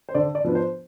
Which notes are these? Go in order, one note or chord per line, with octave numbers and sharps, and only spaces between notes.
C5
D3 D5
D5
F3 B3 D4
C5